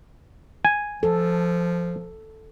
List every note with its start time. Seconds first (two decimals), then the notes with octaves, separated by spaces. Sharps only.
0.65 G#5
1.03 F3 A4